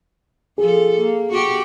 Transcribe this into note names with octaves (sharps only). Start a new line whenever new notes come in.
F3 G#4 A4
A#3
F#4 G4